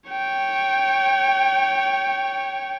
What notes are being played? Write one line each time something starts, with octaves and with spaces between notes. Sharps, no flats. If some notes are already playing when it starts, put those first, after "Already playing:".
C#5 G5